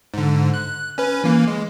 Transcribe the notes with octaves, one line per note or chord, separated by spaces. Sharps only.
G#2 D3
F#6
C#4 B4
E3 A#3
G#3